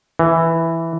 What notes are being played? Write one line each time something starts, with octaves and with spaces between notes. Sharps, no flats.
E3